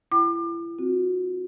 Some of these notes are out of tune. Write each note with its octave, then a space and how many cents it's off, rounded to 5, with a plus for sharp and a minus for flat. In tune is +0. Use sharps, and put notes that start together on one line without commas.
E4 +35 G5 -25 D6 +35
C4 +0 F#4 -20